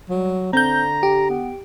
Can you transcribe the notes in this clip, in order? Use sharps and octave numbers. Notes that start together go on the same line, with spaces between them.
F#3 G3
D3 C4 A#5 G6
G4
B3